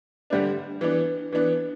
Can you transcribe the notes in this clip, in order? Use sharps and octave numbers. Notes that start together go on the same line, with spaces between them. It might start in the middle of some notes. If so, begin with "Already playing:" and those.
D3 G3 D4
E3 B3 D4
E3 B3 D4